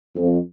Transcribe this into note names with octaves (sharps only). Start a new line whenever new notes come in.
F2